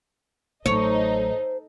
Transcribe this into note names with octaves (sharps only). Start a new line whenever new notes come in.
A1 F#3 D#4 A4 C5 C#5 D#5